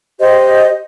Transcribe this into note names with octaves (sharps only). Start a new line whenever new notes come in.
G4 C5 D#5